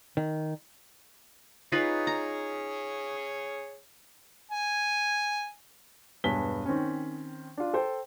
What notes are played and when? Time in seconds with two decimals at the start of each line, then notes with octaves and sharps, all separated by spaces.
0.17 D#3
1.72 D#4 F4 G#4 B4 C#5
2.07 A#5
4.51 G#5
6.24 E1 G2 B3 G#5 B6 G7
6.66 D#3 C4 C#4
7.57 D4 F4
7.74 A4 C5 G5